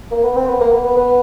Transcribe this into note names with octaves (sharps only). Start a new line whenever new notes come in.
A#3
B3
C4
B3
A#3
B3
B3
B3